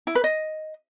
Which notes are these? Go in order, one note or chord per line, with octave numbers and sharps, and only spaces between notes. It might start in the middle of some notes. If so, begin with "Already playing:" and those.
E4
B4
D#5